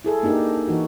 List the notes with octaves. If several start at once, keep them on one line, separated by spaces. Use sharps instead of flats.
E4 G#4 A4
A#3 D4 D#4 G4 A#4
E3 D#4 F#4